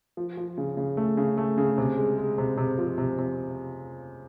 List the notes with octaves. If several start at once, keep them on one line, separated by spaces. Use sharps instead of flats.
F3
F3
C#3
C#3
A3
C#3
A3
C#3
C3
G#3
G#3
C3
C3
F3
C3
C3